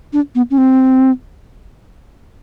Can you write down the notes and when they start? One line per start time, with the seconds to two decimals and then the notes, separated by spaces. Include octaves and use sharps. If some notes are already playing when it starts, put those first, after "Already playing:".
0.13 D4
0.35 B3
0.51 C#4
0.58 C4